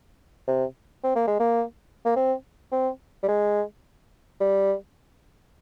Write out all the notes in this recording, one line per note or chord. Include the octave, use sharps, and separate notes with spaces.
C3
C4
A#3
G#3
A#3
A#3
C4
C4
G3
G#3
G3